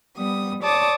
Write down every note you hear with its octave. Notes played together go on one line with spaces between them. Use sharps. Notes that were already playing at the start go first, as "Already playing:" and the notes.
G3 B3 D#6
C#5 D5 A5 D6 D#6